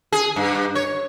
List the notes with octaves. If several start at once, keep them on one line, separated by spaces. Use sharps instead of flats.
G#4
G2
C#5